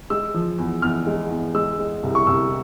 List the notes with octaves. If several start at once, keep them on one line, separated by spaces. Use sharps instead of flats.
G#3 E6
F3
E2
E2 F6
G#3
E2
G#3 E6
G#3
C2
C#6
C2 E6